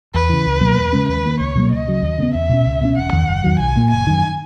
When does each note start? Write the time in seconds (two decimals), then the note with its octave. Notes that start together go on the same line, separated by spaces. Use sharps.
0.14 E2 B4
0.29 C#3 E3
0.46 C#2
0.61 B2 F#3 A#3
0.77 E2
0.93 C#3 G#3 C#4
1.09 D#2 B4
1.25 D#3 A#3
1.39 C#2 C#5
1.55 B2 F#3 A#3
1.72 C#2 D#5
1.87 C#3 F#3
2.02 D#2
2.18 C#3 G#3 B3
2.34 E2 E5
2.49 B2 A#3 C#4
2.66 C#2
2.81 B2 G#3 C#4
2.97 E1 F#5
3.12 E2 D#3
3.28 F#1
3.44 E2 D#3 F#3
3.60 B1 G#5
3.76 A#2 A#3
3.91 F#1 G#5
4.07 F#2 D#3